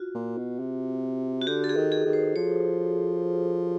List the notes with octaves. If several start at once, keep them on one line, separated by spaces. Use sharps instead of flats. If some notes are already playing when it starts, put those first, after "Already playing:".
Already playing: F4 F#4
A#2
B2
C3
F#4
D3 G4
A4
G#4
D#3
G#4
D#3
C5
F3 C#5